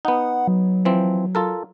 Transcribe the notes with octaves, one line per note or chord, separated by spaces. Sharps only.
B3 D#4 F#5
F#3
E3 F3 C4
F4 A4 A#4